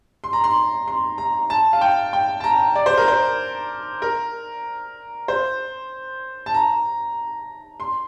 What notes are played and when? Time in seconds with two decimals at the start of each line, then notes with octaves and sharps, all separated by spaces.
0.24 C6
0.33 A#5
0.44 C6
0.88 C6
1.18 A#5
1.50 A5
1.73 F5
1.81 G5
2.13 G5
2.40 A5
2.44 A#5
2.75 D5
2.86 C5
2.97 A#4
3.08 C5
4.02 A#4
5.28 C5
6.46 A5
6.54 A#5
7.80 C6